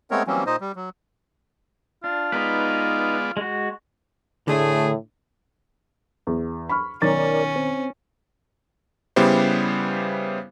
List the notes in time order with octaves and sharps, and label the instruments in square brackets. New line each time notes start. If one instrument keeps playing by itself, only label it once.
[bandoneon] G#3 A3 B3 C4 A#4 C#5
E3 F#3 G3 A#3 C4 C#4
A#2 D#4 C5 D#5
G3
F#3
[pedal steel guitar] D4 [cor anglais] F4
[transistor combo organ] G#3 B3 D5 [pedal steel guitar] D#4 B4
[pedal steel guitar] G#3 F#4
[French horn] A2 [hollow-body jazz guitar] D3 [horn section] A3 G#4
[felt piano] E2
B5 C#6 F6
[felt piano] B1 D#3 A6 [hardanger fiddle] C#4 [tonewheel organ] A#4 C#5 D5
[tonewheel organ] C4
[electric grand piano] C#3 G3 B3 E4 G4 C5